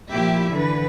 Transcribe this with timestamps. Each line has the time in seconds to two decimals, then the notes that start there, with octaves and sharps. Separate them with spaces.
0.10 A#2 F3 E4 G4 E5
0.54 D3 E3 B4